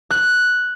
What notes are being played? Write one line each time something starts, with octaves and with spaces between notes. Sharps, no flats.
F#6